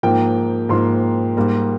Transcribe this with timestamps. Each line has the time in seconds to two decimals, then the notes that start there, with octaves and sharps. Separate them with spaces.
0.03 G#2 F3 A#3 G5
0.69 G#2 F3 A#3 C6
1.37 G#2 G3 A#3